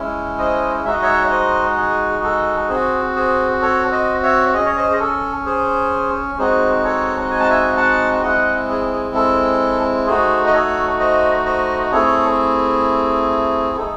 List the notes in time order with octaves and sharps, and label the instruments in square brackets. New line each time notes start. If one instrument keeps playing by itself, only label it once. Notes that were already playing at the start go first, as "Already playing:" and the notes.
Already playing: [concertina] G#3 C#4 E4
C5 D#5
G#3 D#4 F#4 E5
D#5
C#5 E5
C5 D#5
G#4
A4
C4 F#4 G#4 C5
G#4 C5
A4 C#5
C5 D#5
C#5 E5
C#4 G#4 D#5
C#5
C5 D#5
G#4
A4
G#4 C5
G#3 C4 D#4 F#4 G#4 C5
A4 C#5
G#5
A5
E5 G#5
F#5 A5
G#3 C4 E4 D#5 F#5
G#4
G#4
A4
A3 D#4 F#4 G#4 C5
D#5
A4 C#5
C5 D#5
C5 D#5
A3 C4 E4 G#4 A4 C#5
A3 D#4 G#4 A4